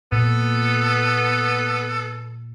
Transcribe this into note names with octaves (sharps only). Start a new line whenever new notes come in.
A#2 B3 A4